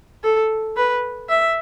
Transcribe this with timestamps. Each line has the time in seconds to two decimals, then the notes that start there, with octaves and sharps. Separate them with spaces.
0.24 A4
0.77 B4
1.29 E5